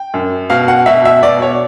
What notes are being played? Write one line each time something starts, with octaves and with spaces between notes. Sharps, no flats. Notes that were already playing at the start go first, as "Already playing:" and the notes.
Already playing: G5
F#2
B2 F5
F#5
B2 E5
E5
B2 D5
C#5